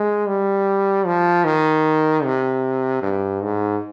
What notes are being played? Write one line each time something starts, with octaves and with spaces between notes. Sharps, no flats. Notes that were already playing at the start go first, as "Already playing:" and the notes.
Already playing: G#3
G3
F3
D#3
C3
G2
G#2